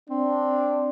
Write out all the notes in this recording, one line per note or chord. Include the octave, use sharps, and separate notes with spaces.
C4 D4